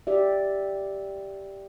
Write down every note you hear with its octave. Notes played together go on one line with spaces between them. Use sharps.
G4 D5 E5